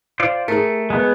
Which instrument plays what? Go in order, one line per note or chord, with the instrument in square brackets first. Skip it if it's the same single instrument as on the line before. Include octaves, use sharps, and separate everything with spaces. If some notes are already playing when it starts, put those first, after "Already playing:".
[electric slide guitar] F4 C5 D5
[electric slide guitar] A3 [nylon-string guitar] G#4 A#4
[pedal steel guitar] G#3 B3